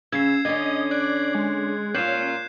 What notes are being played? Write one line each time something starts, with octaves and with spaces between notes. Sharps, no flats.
C#3 E6 G#6 C7
D3 C#4 D#5 G#6
D5 F#6
G#3
A#2 C#4 F4 G6 C7 E7